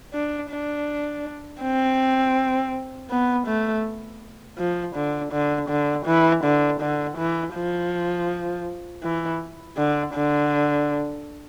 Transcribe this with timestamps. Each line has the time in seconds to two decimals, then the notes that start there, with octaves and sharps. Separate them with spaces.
0.13 D4
0.50 D4
1.62 C4
3.10 B3
3.47 A3
4.58 F3
4.96 D3
5.32 D3
5.69 D3
6.06 E3
6.44 D3
6.81 D3
7.18 E3
7.55 F3
9.03 E3
9.77 D3
10.14 D3